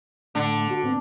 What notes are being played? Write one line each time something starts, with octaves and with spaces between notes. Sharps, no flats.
A2 D3 A3
F#4
G#2 B3 C4